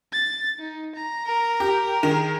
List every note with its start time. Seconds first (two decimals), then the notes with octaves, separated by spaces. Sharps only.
0.13 A6
0.59 D#4
0.95 A#5
1.27 A#4
1.60 G4
2.03 D#3 G#4